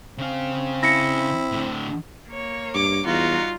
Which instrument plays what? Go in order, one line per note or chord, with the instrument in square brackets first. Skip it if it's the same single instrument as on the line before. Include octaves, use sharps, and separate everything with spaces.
[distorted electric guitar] C#3 F5 [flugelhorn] C4
[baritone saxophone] E4 [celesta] A#6 C#7
[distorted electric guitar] A2 D3
[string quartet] A#3 C#5
[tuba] G2 [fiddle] D6
[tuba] E2 [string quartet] G3 D#4 F#4 [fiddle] F4